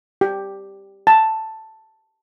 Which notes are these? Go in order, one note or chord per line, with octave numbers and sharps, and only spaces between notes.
G4
A5